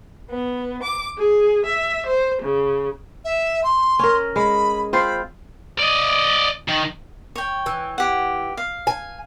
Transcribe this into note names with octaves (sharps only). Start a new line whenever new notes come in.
B3
D6
G#4
E5
C5
C#3
E5
C6
C#4 A#4
G#3 B5
C4 F4 C5 B5
D5 D#5
D#3
C#5 G5
E3
G4 F#5
F5
G#5